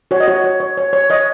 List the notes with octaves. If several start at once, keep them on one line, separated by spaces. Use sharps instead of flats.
F#4 C#5
D#5
F#4 C#5
C#5
C#5
C#5
C#5
C#5 D#5